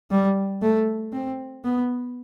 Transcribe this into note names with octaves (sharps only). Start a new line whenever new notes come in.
G3
A3
C4
B3